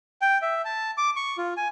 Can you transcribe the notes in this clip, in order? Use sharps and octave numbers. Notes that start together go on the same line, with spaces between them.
G5
E5
A5
D6
C#6
F4
G#5